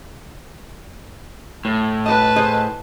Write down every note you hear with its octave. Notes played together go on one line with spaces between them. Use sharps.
A2
F#4 B4 D#5 A5
G#4 C5 D#5